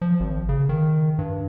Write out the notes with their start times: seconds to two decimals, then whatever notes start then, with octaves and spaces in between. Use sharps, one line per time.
0.02 F3
0.20 G#1
0.49 C#3
0.69 D#3
1.19 G2